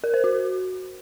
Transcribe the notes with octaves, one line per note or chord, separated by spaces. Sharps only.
A#4
C5
F#4